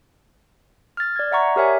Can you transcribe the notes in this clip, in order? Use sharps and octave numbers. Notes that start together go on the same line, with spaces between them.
F6 A6
D5 G#6
D5 E5 F#5 A#5 C#6
G4 A#4 C#5 E5 G#5